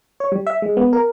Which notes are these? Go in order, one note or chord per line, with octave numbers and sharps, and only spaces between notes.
C#5
G3
E5
G#3
B3
A#4